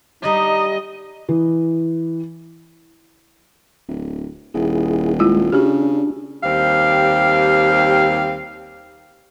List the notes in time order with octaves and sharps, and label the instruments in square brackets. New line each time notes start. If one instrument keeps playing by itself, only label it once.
[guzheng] G3 D4 [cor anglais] D#4 [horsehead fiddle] D#5
[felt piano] E3
[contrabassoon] D1
[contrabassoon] D#1 [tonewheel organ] E4 G#4
[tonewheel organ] G#3 [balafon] E4 F4
[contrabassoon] C#3 [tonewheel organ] D4 [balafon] F#4 G4
[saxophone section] D#2 G3 C4 G4 F5